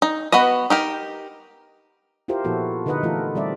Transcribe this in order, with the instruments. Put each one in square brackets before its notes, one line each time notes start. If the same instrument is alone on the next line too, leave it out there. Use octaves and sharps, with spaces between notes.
[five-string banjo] D#4
B3 F#4 B4 D#5
D#4 G4 A#4
[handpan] E4 F4 G4 A#4 C5
A#2 F3 B3 E4 F#4 A4
D3 D#4 A#4 B4 D#5 F#5
E3 A3 E4 F4 A4 A#4
G3 C4 D5 E5